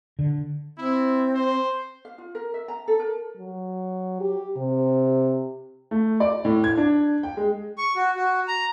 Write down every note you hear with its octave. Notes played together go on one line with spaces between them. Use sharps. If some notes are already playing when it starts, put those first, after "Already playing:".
D3
C4 E4
C5
F5
F4
A#4
E5
A#5
A4
A#4
F#3
G4
C3
A3
D5
A2
G#6
D4
G5
G#3
C#6
F#4
F#4
A#5